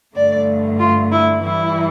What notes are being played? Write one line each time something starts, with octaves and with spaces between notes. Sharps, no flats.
G2 D3 A3 D5
F4
E4
G2 E3 G3 E4